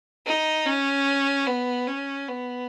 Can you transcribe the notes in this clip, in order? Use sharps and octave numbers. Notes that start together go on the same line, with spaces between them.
D#4
C#4
B3
C#4
B3